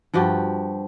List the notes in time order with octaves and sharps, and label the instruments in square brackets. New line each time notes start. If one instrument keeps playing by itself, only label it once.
[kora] G2 F3 F#4 G4